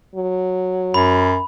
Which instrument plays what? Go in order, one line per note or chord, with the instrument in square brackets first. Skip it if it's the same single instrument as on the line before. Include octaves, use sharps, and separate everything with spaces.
[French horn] F#3
[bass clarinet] F#2 [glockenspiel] B5